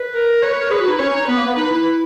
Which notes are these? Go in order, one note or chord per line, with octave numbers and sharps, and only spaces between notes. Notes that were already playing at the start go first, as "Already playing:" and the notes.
Already playing: B4
A#4
B4 C#5
B4
A#4
G#4 B4
F#4
D#4
E4
C#4 C#5
D#4
B3 B4
A#3
B3
D#4 B4
E4